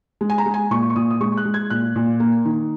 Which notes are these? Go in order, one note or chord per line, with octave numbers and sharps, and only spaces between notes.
G#3
G#5
A#5
G#3
G#5
A#2 C#6
C#6
A#2 D#6
D#6
G#3 C#6
F#6
G#3
G#6
A#2 F#6
A#2
A#3
D#3